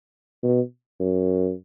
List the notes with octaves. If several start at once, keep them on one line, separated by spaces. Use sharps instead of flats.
B2
F#2